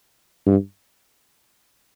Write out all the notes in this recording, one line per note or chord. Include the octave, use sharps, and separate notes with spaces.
G2